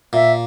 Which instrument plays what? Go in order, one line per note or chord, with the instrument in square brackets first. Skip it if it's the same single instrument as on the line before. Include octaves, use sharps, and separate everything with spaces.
[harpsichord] A#2 [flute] E5